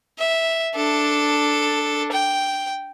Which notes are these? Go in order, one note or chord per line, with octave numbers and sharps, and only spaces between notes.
E5
D4 A4
G5